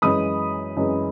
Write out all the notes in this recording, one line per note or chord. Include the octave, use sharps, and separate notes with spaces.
F#2 E3 G#3 B5 D#6
F#2 E3 G#3